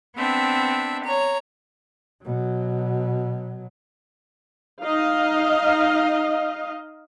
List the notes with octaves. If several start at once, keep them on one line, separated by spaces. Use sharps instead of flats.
B3 C4 D4 E5
C#5 A#5
B2 F#3
D#4 D#5 F5